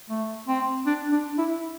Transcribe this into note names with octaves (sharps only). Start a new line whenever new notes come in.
A3
C4
D4
D4
E4